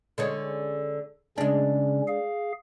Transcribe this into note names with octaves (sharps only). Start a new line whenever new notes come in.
D3 G#3 C#4
C#3 G#3 C#4 D4
G#4 F5